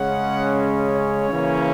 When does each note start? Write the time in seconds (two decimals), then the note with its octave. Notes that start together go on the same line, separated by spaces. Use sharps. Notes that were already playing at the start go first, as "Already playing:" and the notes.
Already playing: C#3 G#3 C#4 F#5
0.94 C#5
1.30 C#3 E3 A#3 C#4